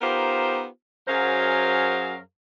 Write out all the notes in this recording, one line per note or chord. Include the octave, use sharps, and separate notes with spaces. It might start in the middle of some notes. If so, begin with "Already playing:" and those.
B3 D#4 F4 G4 A#4 C5
F#2 F#3 G#4 A#4 C5 F5